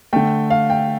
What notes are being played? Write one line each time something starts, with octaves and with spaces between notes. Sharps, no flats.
D3 A3 G5
F5
G5